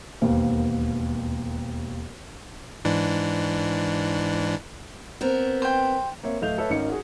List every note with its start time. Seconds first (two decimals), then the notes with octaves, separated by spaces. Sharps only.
0.21 E1 D#2 A#3 B3 C5
2.85 G#2 E3 D4
5.21 B3 C4 A#4
5.62 C5 G5
6.23 A#3 C4 C#5 E5
6.42 D1 A3 D#5 F5 G6 F7
6.58 A4 B4 C#5 E5
6.70 G#1 C#4 D#4 A#4 C#5 C#7
6.89 F#4 G#4